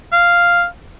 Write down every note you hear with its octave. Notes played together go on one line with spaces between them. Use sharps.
F5